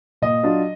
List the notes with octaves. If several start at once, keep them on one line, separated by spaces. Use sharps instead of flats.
A#2 D#5
F#3 D4 F4